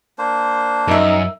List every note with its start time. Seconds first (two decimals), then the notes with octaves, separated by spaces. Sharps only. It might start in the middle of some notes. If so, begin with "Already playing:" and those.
0.18 A#3 D4 C5
0.88 F#2 D#4 A#4 E5